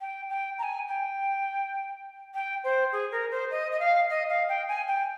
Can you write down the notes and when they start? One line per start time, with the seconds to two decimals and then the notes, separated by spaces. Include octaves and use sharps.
0.01 G5
0.30 G5
0.58 A#5
0.63 G#5
0.88 G5
2.34 G5
2.64 C5
2.92 G#4
3.12 A#4
3.31 C5
3.51 D#5
3.72 D#5
3.80 F5
4.10 D#5
4.29 F5
4.49 G5
4.68 G#5
4.88 G5